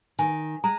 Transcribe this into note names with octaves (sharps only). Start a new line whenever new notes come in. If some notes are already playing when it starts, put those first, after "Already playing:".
D#3 G#5
G#3 A#5